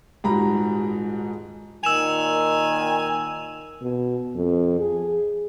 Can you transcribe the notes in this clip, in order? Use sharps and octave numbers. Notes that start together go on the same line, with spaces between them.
D#1 G#2 G3 F#4 A#5 B5
A#2 D#3 G#5 E6 E7 F7
B2
F2
G#4